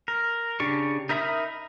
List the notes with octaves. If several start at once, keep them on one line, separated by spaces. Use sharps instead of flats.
A#4
C#3 D4 G4 C#6
D#4 A#4 E5 B5 D#6